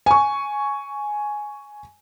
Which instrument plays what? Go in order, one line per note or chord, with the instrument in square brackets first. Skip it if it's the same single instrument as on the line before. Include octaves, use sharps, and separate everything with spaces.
[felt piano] G#5 C#6